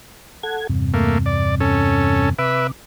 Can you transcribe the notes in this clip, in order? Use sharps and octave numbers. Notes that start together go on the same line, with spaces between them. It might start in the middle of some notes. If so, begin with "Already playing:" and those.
A4 F#5 G#6
E2 G2 C3
A3 A#3
D5
C#4 A4
C3 B4 E5 D6